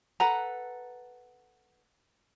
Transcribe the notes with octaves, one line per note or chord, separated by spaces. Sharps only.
A4 B4 F#5 A#5